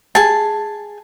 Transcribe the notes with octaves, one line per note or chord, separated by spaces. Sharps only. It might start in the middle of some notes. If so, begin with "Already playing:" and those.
G#4 A5